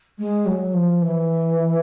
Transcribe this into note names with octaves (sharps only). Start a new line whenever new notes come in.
G#3
F#3
F3
E3